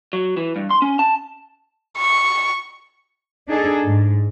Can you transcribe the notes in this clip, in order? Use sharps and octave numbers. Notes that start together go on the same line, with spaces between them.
F#3
E3
G2
C6
C#4
A5
C#6
D4 D#4 G#4 A4
G#2